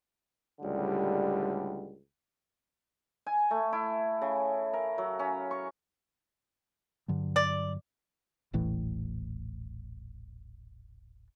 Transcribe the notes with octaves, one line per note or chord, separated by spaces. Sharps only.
C#2 A2 D3 G3
G#5
A3
E4
C#3
A#4
F#3
C#4
C#6
G2 D3 F#3
D5
D#1 A1 A2 E3